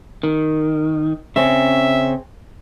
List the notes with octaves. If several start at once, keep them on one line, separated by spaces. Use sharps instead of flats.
D#3
C#3 C4 C#4 E5